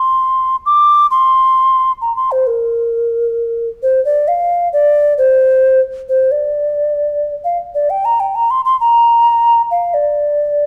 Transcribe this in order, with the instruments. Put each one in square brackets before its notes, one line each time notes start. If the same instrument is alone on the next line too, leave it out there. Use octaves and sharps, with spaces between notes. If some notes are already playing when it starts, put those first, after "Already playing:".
Already playing: [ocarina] C6
D6
C6
A#5
C6
C5
A#4
C5
D5
F5
D5
C5
C5
D5
F5
D5
G5
A#5
G5
A#5
C6
C6
A#5
F5
D5